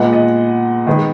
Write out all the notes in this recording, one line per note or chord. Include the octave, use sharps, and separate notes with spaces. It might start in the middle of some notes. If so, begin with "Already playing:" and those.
Already playing: A#2 G#3 B3 F#5
D#5
D#3 G#3 B3